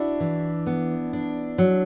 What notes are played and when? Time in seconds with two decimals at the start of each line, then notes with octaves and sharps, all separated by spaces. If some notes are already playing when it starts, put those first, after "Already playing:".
Already playing: D4 E4 F#4
0.20 E3
0.67 B3
1.13 D4
1.58 F#3